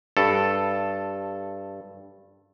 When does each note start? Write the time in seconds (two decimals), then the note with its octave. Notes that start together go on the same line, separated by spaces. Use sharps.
0.17 G2 A4